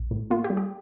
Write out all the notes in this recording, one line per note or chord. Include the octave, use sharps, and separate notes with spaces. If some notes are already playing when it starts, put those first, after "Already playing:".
Already playing: A#1
A2
A#3 F4
G4
G3
G4